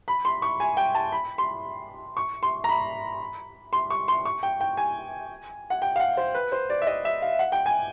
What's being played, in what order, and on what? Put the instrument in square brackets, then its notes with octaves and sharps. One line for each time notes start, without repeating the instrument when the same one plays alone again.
[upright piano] B5
C6
C#6
G#5
G5
A5
B5
C6
C#6
C6
A#5
B5
C6
C#6
C6
C#6
G5
G5
G#5
F#5
G5
F5
F#5
C5
B4
C5
D5
E5
D#5
E5
F5
F#5
G5
G#5